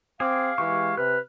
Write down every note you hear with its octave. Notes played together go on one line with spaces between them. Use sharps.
C4 G#4 F5 D6
E3 G#3 G4 C#6
C3 B4 F6 F#6